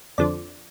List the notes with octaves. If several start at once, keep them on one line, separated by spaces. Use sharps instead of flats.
F2 D3 F3 D5